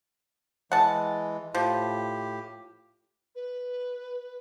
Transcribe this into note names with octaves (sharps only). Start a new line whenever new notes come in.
E3 G#3 F#5 A5
A2 F3 G4
B4